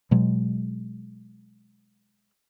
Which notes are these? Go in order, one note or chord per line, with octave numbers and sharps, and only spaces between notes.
B2 F#3 G#3